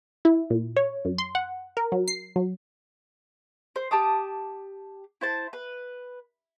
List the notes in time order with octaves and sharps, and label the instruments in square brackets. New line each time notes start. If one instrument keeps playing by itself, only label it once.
[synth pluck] E4
A#2
C#5
F#2
C6
F#5
A#4
F#3
C7
F#3
[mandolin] C5
G4 A5 D6 D#6
E4 C5 A5
B4